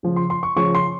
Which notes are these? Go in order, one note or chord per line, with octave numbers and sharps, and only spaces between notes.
C#3 F3
C6
C6
C#6
C#3 F3 C#6
C6